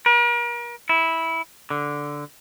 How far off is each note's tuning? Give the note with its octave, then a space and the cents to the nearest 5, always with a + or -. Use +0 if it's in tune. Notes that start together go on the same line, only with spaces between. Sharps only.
A#4 +40
E4 -10
D3 -5